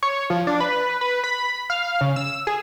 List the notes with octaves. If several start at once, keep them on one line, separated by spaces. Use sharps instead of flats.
C#5
F3
D4
B4
B4
B5
F5
C#3
E6
G#4